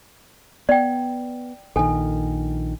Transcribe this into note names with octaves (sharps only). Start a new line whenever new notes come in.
B3 D5 G5
A#1 D#3 A4 G#5